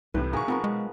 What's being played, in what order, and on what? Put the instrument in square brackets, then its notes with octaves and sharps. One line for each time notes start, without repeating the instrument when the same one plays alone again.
[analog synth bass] C2 [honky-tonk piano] A2 C3 E3 [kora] B4
[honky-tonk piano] B1 C#6 [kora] A#3 F#4 G#4
[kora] F3 B3 A#4 [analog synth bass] C4
[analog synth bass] G#3